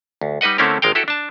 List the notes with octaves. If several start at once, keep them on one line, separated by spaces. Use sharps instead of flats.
D2
G3 D#4 B4 D#5 F#5
D3 A3 C4 C#4 E4 A#4
G#1 G#3 A#4 F5 G5
E4 F#4 G4 A4
D4 A5